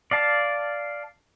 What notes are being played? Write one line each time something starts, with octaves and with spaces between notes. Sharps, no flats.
D5 F5 A5